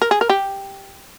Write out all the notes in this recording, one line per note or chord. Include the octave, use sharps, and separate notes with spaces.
A#4
G#4
A#4
G4